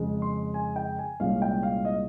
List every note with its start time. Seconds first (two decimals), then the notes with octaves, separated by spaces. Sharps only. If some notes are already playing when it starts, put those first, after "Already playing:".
Already playing: F2 C#3 G#3
0.22 C6
0.54 G#5
0.76 G5
0.99 G#5
1.20 C2 A#2 G#3 C#4 F5
1.42 G5
1.63 F5
1.85 D#5